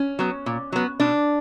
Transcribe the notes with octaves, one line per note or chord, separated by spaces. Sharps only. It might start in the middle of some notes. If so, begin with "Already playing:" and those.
Already playing: C#4
F#3 B3
A#2
F#3 B3
B2 D4